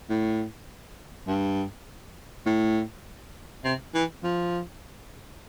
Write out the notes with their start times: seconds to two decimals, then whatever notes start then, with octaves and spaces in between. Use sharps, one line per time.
0.10 A2
1.28 G2
2.46 A2
3.64 C3
3.94 E3
4.23 F3